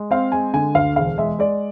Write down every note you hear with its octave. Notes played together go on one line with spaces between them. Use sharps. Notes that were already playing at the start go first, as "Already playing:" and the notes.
Already playing: G#3
C4 F5
G#3 G#5
D3 G#5
D2 F5
E1 F5
G#3 E5
G#3 D5